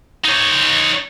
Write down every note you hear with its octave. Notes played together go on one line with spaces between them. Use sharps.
D#4 C#5